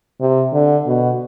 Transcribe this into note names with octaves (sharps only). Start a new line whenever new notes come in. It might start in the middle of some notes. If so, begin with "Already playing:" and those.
C3
D3
B2